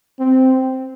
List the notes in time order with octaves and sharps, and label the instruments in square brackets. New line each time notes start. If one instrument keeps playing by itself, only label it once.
[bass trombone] C4